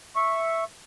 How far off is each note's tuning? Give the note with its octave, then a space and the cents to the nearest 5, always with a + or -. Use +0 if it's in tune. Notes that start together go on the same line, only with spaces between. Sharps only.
E5 +0 C#6 -10